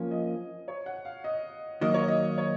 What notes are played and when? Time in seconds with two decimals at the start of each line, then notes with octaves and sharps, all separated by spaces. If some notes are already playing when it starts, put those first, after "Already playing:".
Already playing: F3 A#3 C#4
0.11 D#5
0.68 C#5
0.86 F#5
1.05 F5
1.24 D#5
1.81 D#3 F#3 A#3 D#5
1.94 C#5
2.08 D#5
2.38 C#5